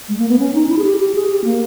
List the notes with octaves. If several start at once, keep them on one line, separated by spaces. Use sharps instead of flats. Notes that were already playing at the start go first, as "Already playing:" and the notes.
G#3
A#3
B3
C#4
D#4
E4
G#4
G4
G4
G#4
G4
A#3